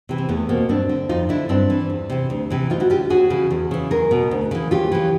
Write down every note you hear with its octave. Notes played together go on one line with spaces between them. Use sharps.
C3 E3
C4
E2 A3 B3
B2 A#3 C4
G2 C4 D4
D3
F2 D#4 F4
D3 D4 E4
G2 C4 D4
E3
E2
C3 E3
D2
C3 E3
D2 D#4 F4
E4 F#4
D3 F4 G4
D#2 F#4 G#4
C#3 E3
E2
C#3 E3
E2 G#4 A#4
B2
D2
C#3 E3
D#2 F4 G4
C#3 E3